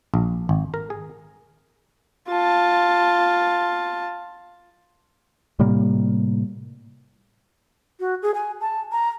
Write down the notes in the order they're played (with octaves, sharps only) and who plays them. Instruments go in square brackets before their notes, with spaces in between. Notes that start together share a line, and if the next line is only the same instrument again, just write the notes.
[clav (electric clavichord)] A#1
G#1
A#4
G#4
[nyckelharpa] F4 A5
[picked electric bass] A2 C3 G3 A#3
[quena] F#4
G#4
G#5
A5
A#5